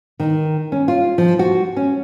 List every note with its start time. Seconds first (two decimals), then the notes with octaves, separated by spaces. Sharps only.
0.20 D#3
0.72 C#4
0.88 F4
1.18 F3
1.39 F#4
1.76 C#4